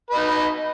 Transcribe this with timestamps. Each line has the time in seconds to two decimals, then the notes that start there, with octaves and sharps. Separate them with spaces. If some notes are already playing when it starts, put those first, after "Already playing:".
0.11 B4
0.14 D#5
0.17 D#4